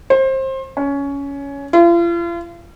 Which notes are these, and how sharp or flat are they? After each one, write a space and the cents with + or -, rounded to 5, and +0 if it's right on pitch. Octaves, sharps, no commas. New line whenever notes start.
C5 +25
C#4 +15
F4 -40